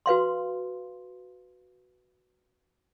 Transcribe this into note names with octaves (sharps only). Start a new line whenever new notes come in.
F#4 B4 F5 C6